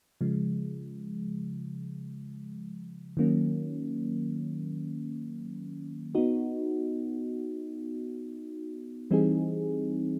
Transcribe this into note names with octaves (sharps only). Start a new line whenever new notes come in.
C#3 F3 G#3
D#3 F#3 A#3 C#4
B3 D#4 F#4
E3 G3 C4 D#4 G#4